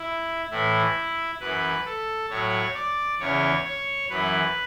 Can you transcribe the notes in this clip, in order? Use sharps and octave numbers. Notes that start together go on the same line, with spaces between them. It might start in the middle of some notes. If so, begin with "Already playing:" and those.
Already playing: E4
A2 E3 E4
F#2 E3 B4
A4
A2 F#3 C#5
D5
E2 C#3 E3 C#5
C#5
F#2 E3 B4